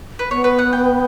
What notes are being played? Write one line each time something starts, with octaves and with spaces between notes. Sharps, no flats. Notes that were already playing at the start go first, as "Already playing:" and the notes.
B4
B3 C#5
B4
F#5
G5